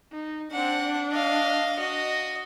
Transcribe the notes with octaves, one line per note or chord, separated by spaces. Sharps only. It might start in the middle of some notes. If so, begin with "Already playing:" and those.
D#4
C4 D4 F#5
D#5 F5
F#4 D#5